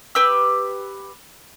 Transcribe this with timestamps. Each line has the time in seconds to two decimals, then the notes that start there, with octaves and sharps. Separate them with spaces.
0.15 G4 B4 E6